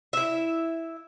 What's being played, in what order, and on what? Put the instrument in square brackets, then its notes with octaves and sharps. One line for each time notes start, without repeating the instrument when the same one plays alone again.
[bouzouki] E4 E5